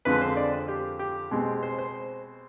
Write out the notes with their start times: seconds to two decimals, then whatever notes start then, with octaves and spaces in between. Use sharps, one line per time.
0.05 F2 D3 F3 G#3 C4 B4
0.21 C5
0.36 D5
0.68 G4
0.99 G4
1.31 B2 G#3 C4
1.63 C5
1.79 C5